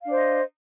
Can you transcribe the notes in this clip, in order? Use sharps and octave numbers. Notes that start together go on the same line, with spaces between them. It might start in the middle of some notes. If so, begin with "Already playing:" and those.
D4 C5 D#5 F5